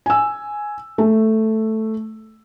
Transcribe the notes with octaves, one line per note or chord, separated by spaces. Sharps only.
G#5 E6
A3